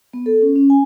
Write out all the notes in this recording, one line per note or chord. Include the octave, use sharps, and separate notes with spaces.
B3
A4
C#4
C#4
G#5